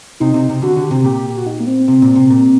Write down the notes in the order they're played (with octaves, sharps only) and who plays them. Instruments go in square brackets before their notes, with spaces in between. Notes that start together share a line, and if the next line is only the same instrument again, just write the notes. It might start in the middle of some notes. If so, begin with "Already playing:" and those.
[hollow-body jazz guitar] C3 [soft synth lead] D#4
[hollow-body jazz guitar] C3
C3
[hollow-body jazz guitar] D3 [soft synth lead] F#4
[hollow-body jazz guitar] D3
[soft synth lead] G4
[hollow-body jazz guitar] C3
[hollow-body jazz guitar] A#2 [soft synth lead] G4
[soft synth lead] G4
F#4
D#4
A#3
C4
[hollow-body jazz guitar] C3
A#2
C3
A#2